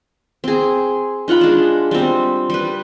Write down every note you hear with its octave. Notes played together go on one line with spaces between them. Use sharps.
C4 G#4
D#4 F4 F#5 B5
G#3 D4
G3 C4
G3 B4